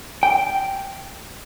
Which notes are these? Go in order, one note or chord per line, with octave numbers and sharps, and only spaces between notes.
G5